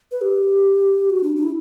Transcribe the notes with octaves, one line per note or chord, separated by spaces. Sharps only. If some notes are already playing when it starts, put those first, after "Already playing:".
B4
G4
F#4
D4
D4
E4